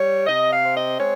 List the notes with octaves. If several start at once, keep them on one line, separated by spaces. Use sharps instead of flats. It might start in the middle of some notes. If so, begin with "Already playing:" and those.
Already playing: G3 C#5
C3 D#5
F5
C4
D#5
G#3 C#5